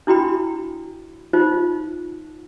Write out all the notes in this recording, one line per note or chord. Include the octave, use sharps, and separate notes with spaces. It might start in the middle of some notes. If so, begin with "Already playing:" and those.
D4 E4 F#4 G5 B5
D#4 F4 C5